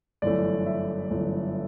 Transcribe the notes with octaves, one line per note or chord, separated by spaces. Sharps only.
G1 F#2 E3 A3 D5
E5
G1 F#2 E3 A3